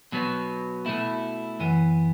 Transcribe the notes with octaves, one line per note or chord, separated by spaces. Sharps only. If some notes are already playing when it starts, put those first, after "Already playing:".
B2 F#3 B3
B2 A3 E4
F#2 E3 B3